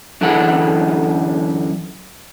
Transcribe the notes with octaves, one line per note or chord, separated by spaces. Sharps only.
F#2 D3 E3 D4 G#4 F#5